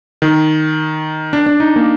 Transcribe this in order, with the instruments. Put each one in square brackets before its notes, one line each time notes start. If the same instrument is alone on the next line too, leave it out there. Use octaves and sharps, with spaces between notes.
[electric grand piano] D#3
D4
D4
D#4
A#3